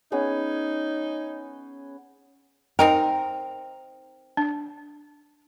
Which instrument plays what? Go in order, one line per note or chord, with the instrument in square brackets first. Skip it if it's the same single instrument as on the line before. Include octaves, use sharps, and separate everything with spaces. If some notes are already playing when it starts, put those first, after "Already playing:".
[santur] B3 C#4 G#4 [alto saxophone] D#4
[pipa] C4 D#4 A#4 [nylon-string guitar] G5
[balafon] D4